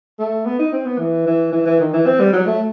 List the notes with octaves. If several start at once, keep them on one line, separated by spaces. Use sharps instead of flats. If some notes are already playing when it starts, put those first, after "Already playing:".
A3
B3
D#4
C4
B3
E3
E3
E3
E3
D#3
E3
C4
G3
F#3
A3